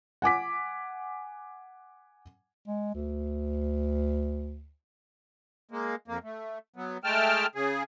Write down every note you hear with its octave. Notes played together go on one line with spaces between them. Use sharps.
F#5 G#5 D6 B6
G#3
D2
G#3 A#3
F2 A#3
A3
F#3 B3
G#3 A3 G5 A5 F6
C#3 G#4